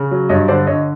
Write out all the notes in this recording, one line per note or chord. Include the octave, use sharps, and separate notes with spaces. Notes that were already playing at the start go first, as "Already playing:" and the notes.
Already playing: C#3
F#3
G2 C#5 D#5
D3 C5 D5
D3 C#5 D#5